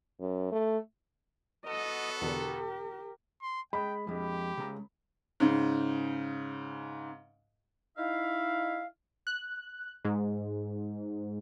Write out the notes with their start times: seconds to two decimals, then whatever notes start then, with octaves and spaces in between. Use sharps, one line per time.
0.20 F#2
0.52 A3
1.66 B3 F#4 A4 D#5
2.21 E2 B2 D3 G4 A#4
3.42 C6
3.73 G#3 G5 B5
4.07 F2 G#3 G4
4.57 C#3 G#3 A#5
5.40 G#2 C#3
7.98 D#4 E4 E5 F5
9.27 F#6
10.05 G#2